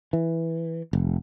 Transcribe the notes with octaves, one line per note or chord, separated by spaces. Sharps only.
E3
F1